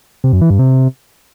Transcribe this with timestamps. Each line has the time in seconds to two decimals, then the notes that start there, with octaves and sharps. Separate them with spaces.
0.24 C3
0.33 F#2
0.41 E3
0.50 G2
0.59 C3